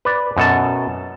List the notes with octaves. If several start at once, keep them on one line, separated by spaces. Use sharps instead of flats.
B4 D5
F#2 B2 A4 A5